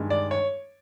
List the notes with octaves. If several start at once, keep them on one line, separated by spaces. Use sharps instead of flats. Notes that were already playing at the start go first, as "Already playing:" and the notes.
Already playing: G2 D#3 G#3
D5
C#5